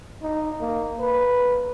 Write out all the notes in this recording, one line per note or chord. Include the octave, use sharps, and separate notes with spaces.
D#4
A#3
B4